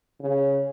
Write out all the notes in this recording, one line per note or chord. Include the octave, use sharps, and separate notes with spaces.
C#3